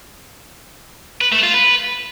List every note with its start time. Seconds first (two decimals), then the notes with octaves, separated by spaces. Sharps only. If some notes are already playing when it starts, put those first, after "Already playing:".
1.21 B4
1.32 A3
1.43 F4
1.54 B4